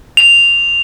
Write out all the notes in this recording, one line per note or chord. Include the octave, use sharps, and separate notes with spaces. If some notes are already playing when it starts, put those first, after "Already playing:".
F7